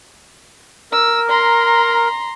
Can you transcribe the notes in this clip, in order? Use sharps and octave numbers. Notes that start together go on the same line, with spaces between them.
A#4 E6
A#5 C6